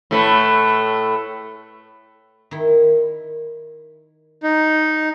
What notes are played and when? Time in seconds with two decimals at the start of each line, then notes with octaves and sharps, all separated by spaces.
0.11 A2 A3 B4
2.51 D#3 E4
4.43 D#4